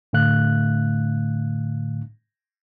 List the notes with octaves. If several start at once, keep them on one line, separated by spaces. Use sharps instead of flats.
A2 D3 A3 F5 F#6